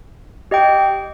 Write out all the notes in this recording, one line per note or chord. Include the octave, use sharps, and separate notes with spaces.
G4 D#5 G5